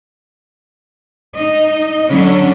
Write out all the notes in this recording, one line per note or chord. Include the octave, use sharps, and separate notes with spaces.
D#4 D#5
D3 F#3 C#4 D4